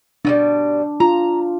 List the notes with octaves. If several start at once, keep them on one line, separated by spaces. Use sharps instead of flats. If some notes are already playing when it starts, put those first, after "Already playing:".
B2 F#3 G3 D4
F4 A#5